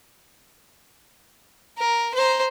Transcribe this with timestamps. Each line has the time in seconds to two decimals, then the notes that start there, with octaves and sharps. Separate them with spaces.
1.78 A#4
2.14 C5 A#5